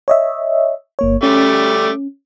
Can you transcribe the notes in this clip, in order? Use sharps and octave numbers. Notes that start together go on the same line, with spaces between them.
C#5 D#5 E5
G1 A#3 C#5
G3 A3 C#4 D6